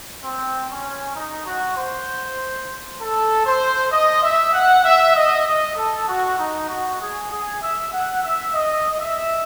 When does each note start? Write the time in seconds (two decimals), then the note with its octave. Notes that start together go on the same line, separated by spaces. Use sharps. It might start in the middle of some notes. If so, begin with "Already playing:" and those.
0.23 C4
0.69 C#4
1.16 D#4
1.46 F#4
1.77 C5
3.00 A4
3.46 C5
3.92 D#5
4.23 E5
4.53 F#5
4.85 E5
5.15 D#5
5.47 D#5
5.77 A4
6.08 F#4
6.39 D#4
6.69 F#4
7.01 G#4
7.31 G#4
7.62 E5
7.93 F#5
8.23 E5
8.54 D#5
9.01 E5